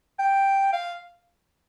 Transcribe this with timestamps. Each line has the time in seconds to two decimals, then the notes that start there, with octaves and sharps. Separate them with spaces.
0.19 G5
0.73 F5